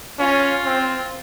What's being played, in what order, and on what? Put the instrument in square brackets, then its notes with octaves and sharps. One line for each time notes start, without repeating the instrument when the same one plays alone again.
[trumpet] C#4 [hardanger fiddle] F4
[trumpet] C4